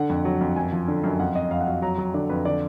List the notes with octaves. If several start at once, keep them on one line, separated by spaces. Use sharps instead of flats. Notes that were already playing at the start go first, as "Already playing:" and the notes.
Already playing: D3 F#5
F2
F#3
F2
F#2 G#5
F3
D3
F#2
F2 F#5
F2 D#5
F2 F5
F#5
F#3 F5
F#3 A#5
F#3
D3 D5
F2 B4
D3 D5